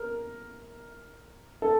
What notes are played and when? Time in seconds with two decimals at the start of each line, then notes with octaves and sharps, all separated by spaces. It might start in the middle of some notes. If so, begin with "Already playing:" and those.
Already playing: A#4
1.62 A4